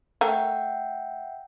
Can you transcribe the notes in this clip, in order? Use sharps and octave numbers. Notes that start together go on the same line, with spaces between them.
A3 A#4 E5 F#5 G5